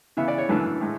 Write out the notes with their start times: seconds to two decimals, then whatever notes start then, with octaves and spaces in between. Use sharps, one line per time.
0.17 C#3 E3 B3 E5
0.28 D5
0.38 C#5
0.49 F#2 E3 A3 D4 B4
0.81 A2 G#3